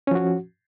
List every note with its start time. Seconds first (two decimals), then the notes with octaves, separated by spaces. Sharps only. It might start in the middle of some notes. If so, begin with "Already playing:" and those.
0.07 C#4
0.11 F3
0.15 F#4